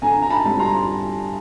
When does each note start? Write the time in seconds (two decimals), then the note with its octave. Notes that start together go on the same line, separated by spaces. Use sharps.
0.02 D3 G#5 A#5
0.22 A#5
0.30 A5 B5
0.45 G3 C4
0.59 A#5 C6